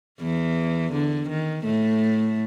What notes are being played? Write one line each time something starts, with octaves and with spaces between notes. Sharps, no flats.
E2 E3
D3
D#3
A2 A3